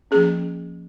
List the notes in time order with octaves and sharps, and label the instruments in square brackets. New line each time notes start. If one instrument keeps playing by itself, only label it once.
[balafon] F3 A#3 C#4 G#4